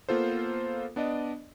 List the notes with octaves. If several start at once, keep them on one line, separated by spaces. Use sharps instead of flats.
A#3 B3 F4 A4 C5
B3 D4 D5 D#5